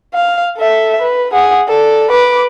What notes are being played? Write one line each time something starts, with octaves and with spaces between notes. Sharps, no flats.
F5
A4 E5
B4
G#4 F#5
A4 D5
B4 D6